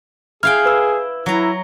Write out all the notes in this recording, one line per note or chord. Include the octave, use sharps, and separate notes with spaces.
E4 G#4 F5 G5 F6
B4 E6
F#3 E4 A#5